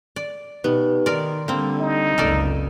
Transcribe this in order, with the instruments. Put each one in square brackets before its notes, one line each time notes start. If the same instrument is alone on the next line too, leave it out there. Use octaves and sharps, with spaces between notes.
[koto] D5
[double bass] B2 [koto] B3 [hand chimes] D#4 G4 B4
[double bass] D#3 [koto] A#4 D5 [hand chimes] C6
[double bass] D3 G3 [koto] A#3 C4
[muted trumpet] D#4
[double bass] F#1 C#2 [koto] A4 A#4 D5